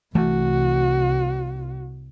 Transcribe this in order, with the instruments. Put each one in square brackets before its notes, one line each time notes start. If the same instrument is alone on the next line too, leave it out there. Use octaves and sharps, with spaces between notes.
[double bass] C2 [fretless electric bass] E3 A3 [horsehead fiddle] F#4